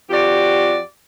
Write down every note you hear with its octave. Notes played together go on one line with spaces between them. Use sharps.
F2 F#4 G4 D5